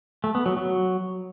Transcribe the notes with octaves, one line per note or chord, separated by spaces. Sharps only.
A3
B3
F#3
F#3